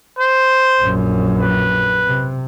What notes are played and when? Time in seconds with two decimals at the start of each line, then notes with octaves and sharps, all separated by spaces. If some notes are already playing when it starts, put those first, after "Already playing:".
0.19 C5
0.80 A#1 F#2
1.40 B4
2.07 C3